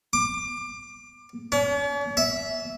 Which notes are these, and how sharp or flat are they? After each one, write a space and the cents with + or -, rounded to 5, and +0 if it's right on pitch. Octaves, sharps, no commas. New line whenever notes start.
D6 +25
C#4 +45
E5 -10